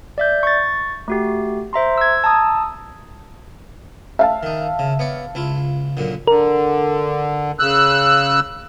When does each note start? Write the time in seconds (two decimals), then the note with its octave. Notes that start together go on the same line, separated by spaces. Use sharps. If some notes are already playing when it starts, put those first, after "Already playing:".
0.18 D5 E5 G6
0.43 C#6 A6
1.08 A3 F#4 G4
1.73 C5 E5 A#5 C6
1.98 E6 G#6
2.24 A5 A#5 D#6 E6
4.19 E5 F5 A5
4.43 D#3 D#4
4.79 C#3
4.99 B3 C#5 D5
5.35 C#2 E4 F4
5.97 F#2 A#2 D3
6.27 D3 A#4
7.59 C#3 E6 F#6